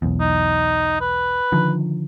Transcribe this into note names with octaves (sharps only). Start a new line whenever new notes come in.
B1 E2
D#4
B4
D3 D#3 F3